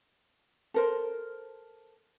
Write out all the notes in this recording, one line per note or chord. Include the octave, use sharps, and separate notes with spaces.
A4 A#4 C5